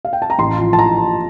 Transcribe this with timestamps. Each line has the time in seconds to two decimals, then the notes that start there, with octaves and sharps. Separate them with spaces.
0.05 F5
0.13 G5
0.22 A5
0.30 A#5
0.38 A1 C6
0.58 F3
0.73 A5
0.79 F3 A#5